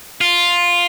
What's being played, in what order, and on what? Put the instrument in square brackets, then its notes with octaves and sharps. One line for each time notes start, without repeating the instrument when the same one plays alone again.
[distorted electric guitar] F4